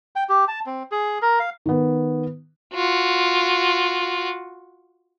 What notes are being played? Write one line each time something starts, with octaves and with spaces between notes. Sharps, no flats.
G5
G4
A5
C4
G#4
A#4
F5
D#3 B3
F4 F#4